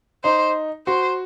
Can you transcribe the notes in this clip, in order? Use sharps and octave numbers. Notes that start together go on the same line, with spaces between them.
D#4 C5
F#4 C5